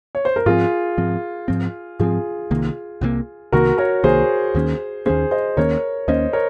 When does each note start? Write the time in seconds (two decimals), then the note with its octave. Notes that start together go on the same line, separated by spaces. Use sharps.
0.15 C#5
0.25 C5
0.36 A#4
0.46 G#2 F3 C4 F4 G#4
0.98 G#2 F3 C4
1.48 G#2 F3 C4
1.99 G#2 F3 C4 F4 G#4
2.51 C2 C3 D#3 A#3
3.01 C2 C3 D#3 A#3
3.52 C2 C3 D#3 A#3 F#4 A#4
3.78 A#4 C#5
4.04 C2 C3 D#3 A#3 G#4 C5
4.55 D#2 D#3 A#3 C#4
5.06 A#3 C#4 G#4 C5
5.09 D#2 D#3
5.31 C5 D#5
5.57 D#2 D#3 A#3 C#4 A#4 C#5
6.08 D#2 D#3 A#3 C#4 C5 D#5
6.33 A#4 C#5